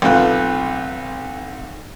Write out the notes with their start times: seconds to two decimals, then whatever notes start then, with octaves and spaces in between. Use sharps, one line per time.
0.02 B1 C3 A3 F4 B4